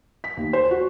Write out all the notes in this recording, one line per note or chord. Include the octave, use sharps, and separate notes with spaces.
B6
D#2
C5
F#4